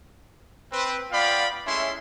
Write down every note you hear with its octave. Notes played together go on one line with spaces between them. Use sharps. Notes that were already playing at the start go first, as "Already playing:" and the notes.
C4 B4
B3 F4 D5 F5 G5 B5
G#3 A3 C#4 E4 E5 C6